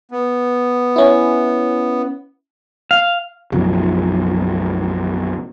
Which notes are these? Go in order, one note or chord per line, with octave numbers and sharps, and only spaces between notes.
B3
C#4 E4
F5
B1 F#2 C#3 F3